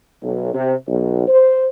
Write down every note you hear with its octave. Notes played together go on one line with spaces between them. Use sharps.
B1
C3
B1
C5